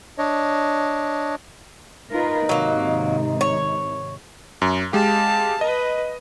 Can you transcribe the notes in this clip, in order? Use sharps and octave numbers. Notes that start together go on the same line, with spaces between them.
D4 C#5 D#5
D#4 F4 A#4 B4
G#2 C3 D#3 F#3 A#3
C#5
F#2
G#3 G4 F5 A5
B4 D#5